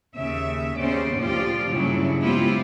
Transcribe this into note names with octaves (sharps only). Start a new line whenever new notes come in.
D#2 C#3 E5
D#2 C#3 B3 C#4 C5 D5
D2 A#2 F3 F4 G4 D5
G2 C#3 F#3 A#3 D4 E4
G#3 B3 E4 F4 G4 C5